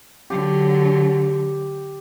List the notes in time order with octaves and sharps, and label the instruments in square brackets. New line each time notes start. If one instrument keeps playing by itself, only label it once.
[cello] D3 F#3 [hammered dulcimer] G4